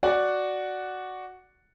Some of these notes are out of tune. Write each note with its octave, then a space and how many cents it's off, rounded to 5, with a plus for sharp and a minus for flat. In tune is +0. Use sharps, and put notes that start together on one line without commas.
F#4 +0 D5 +0 F#5 +0